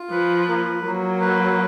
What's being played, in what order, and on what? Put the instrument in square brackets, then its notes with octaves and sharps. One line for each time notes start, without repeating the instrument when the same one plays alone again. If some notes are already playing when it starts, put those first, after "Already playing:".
Already playing: [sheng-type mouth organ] F4
[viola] F3 [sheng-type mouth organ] B4
[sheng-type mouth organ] A#3
[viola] F#3 [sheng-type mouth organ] A#3
[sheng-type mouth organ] B4